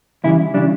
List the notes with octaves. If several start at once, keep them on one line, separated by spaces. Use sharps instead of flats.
E2 C#3 E3 G3 E4
C#3 E3 G3 D4